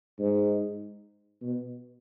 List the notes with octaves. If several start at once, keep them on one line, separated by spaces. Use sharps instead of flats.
G#2
B2